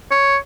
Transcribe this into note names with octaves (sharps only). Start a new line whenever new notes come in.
C#5